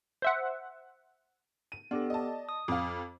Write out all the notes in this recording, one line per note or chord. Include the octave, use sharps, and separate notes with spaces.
C5 E5 F#5
D#7
B3 D4 G4 A4
D5 D#5 A5
D#6
F2 F5 D6